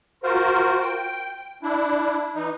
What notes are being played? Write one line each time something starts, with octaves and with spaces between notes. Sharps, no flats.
F4 F#4 A#4 C5
G5
D4 E4
E3 D#4